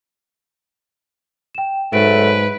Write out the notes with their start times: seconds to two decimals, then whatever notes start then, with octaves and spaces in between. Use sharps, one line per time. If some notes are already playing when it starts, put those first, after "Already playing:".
1.55 G5 E7
1.93 G#2 F#3 A3 B4 D7